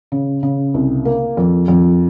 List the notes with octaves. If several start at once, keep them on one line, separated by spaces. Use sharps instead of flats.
C#3
C#3
C2
A#3
F2
F2